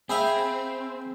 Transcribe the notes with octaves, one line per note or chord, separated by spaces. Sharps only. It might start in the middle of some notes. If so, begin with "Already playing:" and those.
C4 G#4 E5 F5 G5 B5